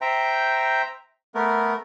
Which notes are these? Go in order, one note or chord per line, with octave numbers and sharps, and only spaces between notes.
C5 E5 G5 A#5
A3 B3 A#4